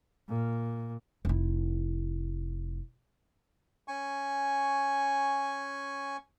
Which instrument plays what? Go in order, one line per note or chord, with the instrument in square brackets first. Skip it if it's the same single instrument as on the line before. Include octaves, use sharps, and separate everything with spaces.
[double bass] A#2
[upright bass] F1 E4
[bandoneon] C#4 G#5 C#6